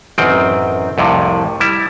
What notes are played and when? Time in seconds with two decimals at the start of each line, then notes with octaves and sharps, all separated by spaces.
0.18 A1 F#2 D#3 C4 G5
0.98 C2 F2 A2 C3
1.60 G3 E4